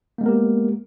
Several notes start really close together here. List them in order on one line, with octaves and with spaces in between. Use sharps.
A#3 G#3 B3 A#4 G4